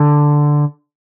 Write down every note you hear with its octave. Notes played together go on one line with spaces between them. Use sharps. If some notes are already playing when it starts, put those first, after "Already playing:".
Already playing: D3